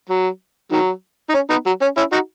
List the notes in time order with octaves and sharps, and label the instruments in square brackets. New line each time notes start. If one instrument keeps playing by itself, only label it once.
[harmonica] F#3
D#3 F#3
D#4
C#4
B3 D#4
F#3
C#4
C#4 E4
D#4 F#4